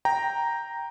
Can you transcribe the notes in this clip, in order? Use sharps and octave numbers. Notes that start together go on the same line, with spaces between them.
G5 A#5